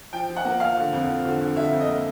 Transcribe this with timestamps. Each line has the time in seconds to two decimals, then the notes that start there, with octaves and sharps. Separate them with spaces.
0.12 F3 G5
0.29 F3
0.37 F#5
0.45 A#3
0.60 F3 F5
0.77 D3
0.93 F2
1.09 F3
1.25 D3
1.41 D3
1.56 D3 E5
1.73 F2
1.80 D#5
1.88 A#3